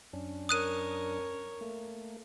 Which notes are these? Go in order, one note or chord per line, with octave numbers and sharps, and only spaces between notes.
F#2 C#4 D4
A#4 C#5 D#6 F#6 D#7
A3 A#3